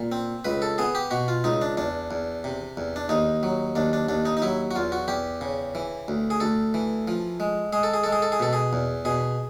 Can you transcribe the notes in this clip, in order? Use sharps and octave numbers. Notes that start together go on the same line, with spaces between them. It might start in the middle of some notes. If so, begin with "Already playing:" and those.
Already playing: A#2
C4
C#2 B4
A4
B3 G#4
G4
B2 F#4
F4
C#2 D#4
D4
E2 D4
E2
C3
E2
D4
D#2 D#4
F#3
D#2 D4
D4
D#2 D4
D#4
D#4
F#3 E4
F#4
E2 F4
F#4
E2 G4
C#3
E3
D2
G#4
D2 A4
E3
F3
G#3
G#3 G#4
A4
G#4
G#3 A4
G#4
A4
G#4
B2 A4
G#4
E2
B2 G#4